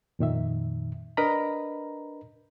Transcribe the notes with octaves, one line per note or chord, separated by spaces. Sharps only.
F2 A#2 D#3 E5
D4 A#4 B4 D#5 A#5 B5